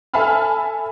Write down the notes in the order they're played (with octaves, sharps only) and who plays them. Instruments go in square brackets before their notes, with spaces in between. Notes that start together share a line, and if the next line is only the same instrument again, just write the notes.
[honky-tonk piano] A4 E5 G#5 A5 B5 F6